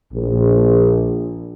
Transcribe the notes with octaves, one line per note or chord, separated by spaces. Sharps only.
A#1